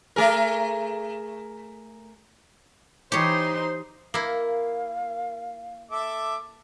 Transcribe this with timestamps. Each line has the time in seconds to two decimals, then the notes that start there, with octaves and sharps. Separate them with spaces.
0.16 A3 G#4 A#4
3.12 E3 D#4 G4 C5 C#5 C6
4.14 A#3 E4 A#4 F5
5.91 A4 E5 D6